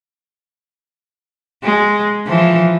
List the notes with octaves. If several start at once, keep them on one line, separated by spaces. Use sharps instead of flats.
G#3
E3 F3